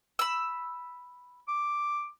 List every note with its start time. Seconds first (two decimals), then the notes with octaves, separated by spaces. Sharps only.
0.19 B5 E6
1.48 D6